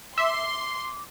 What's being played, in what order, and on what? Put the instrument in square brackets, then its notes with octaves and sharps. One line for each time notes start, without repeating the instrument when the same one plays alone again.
[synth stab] E5 [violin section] C6 [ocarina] D6